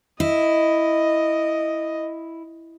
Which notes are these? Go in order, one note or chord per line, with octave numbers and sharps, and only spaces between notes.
E4 D#5